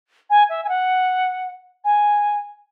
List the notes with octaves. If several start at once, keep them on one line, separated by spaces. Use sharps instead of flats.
G#5
E5
G#5
F#5
G#5